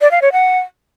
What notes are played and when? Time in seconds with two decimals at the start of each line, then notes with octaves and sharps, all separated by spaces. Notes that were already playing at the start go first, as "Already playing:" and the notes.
0.01 D5
0.11 F5
0.22 C#5
0.32 F#5